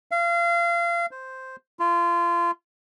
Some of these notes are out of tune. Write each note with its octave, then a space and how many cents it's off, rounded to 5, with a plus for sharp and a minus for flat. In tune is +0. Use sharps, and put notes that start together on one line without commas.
F5 -30
C5 +0
F4 -25